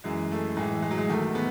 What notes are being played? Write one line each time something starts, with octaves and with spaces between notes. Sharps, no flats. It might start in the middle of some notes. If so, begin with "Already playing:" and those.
F#2 E3 G#3
A3
A2 E3 G#3
G#3
F#3
G#3
E2 D#3 A3
B3